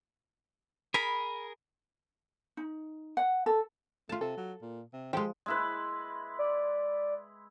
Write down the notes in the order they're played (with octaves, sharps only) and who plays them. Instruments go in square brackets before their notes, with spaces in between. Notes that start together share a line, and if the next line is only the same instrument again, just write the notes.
[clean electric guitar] G#4 A#4 [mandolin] B5
[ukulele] D#4
F#5
A4
[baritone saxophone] A3 [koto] F4 A5
[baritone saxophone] C3 [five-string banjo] A4
[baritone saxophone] F#3
A#2
C3
[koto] F3 G#3 [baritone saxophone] G4 [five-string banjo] A4 F5 G5
[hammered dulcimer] G#3 E4 B4
[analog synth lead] D5